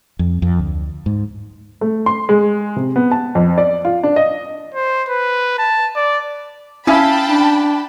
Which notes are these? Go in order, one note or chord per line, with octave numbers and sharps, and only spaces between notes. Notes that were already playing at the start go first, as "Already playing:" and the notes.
F2
F2
D2
G#2
A3
C6
G#3
C3
B3
A5
F2
D5
F4
D4
D#5
C5
B4
A5
D5
C#4 E4 F5 G5 A5 B5
D4